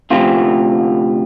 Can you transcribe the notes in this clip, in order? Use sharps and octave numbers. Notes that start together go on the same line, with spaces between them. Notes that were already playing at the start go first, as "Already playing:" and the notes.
D2 C3 F3 F4